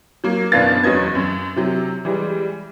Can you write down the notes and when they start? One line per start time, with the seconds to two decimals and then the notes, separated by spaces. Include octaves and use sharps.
0.24 F#3 A#3
0.52 F#1 B2 D4 B4 F5 A6
0.83 E2 F#3 C#4 B4 D#5 G#6
1.15 F#2
1.56 C3 F#3
2.05 E3 G3 G#3